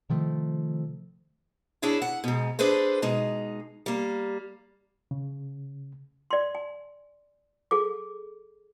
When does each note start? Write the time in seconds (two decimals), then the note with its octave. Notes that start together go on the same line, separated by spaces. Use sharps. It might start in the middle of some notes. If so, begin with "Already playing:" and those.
0.10 C3 D#3 F3 A3
1.82 D4 E4 G#4 C#5
2.02 F#5
2.24 G#2 B2
2.59 D4 G#4 A4 B4 C5
3.02 B2 G#3 D#4
3.86 G3 A#3
5.11 C#3
6.31 D5 C6
6.55 G#5
7.71 G#4 A4 D6